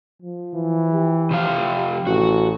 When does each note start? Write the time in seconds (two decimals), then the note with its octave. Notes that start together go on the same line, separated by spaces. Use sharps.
0.23 F3
0.54 E3
0.93 G4
1.31 C3 F3 F5
2.07 A1 F#4